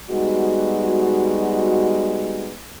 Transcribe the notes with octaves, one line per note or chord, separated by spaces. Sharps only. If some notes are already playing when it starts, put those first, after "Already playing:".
G3 G#3 B3 D#4 F#4